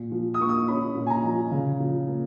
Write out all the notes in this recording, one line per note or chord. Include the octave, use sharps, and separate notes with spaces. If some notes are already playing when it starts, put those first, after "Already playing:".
Already playing: A#2
F3
D#6
A#3 C#6
D#6
C#4 B5
A#2
G#5
A#5
F3
C#3
F3
A#3